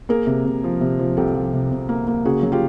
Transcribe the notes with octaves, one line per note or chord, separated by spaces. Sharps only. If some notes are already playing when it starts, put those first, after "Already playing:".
A#3 G#4 A#4
C3
C3
F3
C3
F3
C2 G4 A4
F3
C3
C3
A#3
A#3
C#3 F#4 G#4
F#3
F4 G4